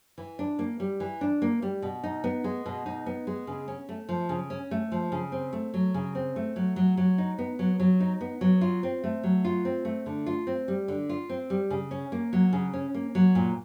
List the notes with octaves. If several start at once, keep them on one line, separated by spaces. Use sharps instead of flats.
E3
D4
A#3
G3
E3
D4
A#3
G3
B2
D#4
B3
G#3
B2
D#4
B3
G#3
C#3
C#4
A3
F3
C#3
C#4
A3
F3
C#3
C4
A3
F#3
C#3
C4
A3
F#3
F#3
F#3
D#4
B3
F#3
F#3
D#4
B3
F#3
F4
C4
A3
F#3
F4
C4
A3
D3
F4
C4
G3
D3
F4
C4
G3
C#3
C#4
A#3
F#3
C#3
C#4
A#3
F#3
A#2